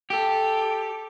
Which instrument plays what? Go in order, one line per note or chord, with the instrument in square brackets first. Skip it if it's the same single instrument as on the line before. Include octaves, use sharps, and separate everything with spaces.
[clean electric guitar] G4 [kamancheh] A4